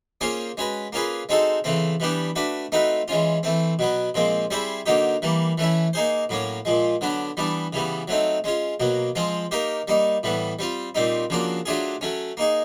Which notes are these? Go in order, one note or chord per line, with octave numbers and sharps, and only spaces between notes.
A#3 C#4 F4 G#4 C5
G#3 C#4 F#4 B4
A#3 C#4 F4 G#4 B4
G#3 C4 D#4 F#4 A4
C#3 E3 A3 C4
E3 G3 B3 D4 G4
A3 D4 F#4 B4
A3 C4 D#4 F#4 B4
E3 G#3 C#4 F4
E3 A3 C4
B2 F#3 B3
A#2 F3 G#3 C4
G3 C4 E4 G#4 C5
D3 F#3 A#3 D#4 G4
E3 G3 A#3
E3 A3 C#4 E4
A#3 D#4 G#4 C5
A2 F#3 A#3 C#4
A#2 F3 G#3
D3 F#3 B3 D4
E3 G3 B3 D4
C#3 E3 G3 B3
F#3 A3 C4 D#4
G#3 C#4 F4
B2 F#3 A#3
F3 G#3 C4 F4
A#3 D#4 G4 A#4
G3 A#3 D#4
A2 E3 G3 B3
G3 C4 F4
A#2 G3 C4 D#4
C#3 F3 A#3 D4 F#4
F#3 A3 D4 F4 G#4
F#3 A3 C#4
A#3 D#4 G#4